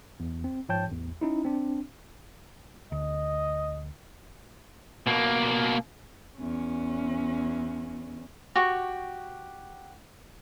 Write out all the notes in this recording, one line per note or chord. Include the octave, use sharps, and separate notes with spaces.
E2
C4
G#2 F3 C#5 G5 A5 G6
A1 E2
C#4 D#4 E4
C4 D4
D2 D#5
B2 A#3
E2 C#4
F#4 G4 C#6